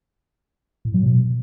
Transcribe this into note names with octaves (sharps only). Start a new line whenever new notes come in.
A2
F#3
B2